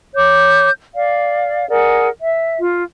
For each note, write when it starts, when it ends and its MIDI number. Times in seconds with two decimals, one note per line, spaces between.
0.15 0.70 73
0.15 0.70 86
0.15 0.70 91
0.94 1.66 74
0.94 1.66 77
1.68 2.08 68
1.68 2.08 70
1.68 2.08 74
1.68 2.08 78
2.20 2.57 76
2.61 2.82 65